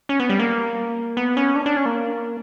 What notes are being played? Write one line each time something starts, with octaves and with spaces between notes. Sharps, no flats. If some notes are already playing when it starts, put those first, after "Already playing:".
C#4
B3
G3
A#3
B3
C#4
D4
D4
C#4
A#3